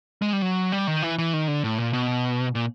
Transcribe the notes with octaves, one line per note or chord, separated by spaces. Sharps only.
G#3
G3
F#3
G3
D#3
E3
E3
D#3
D3
A2
A#2
B2
A#2